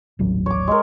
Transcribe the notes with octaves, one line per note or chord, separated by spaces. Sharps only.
D#1 A1 F#3
C#5 D6
G#3 A#4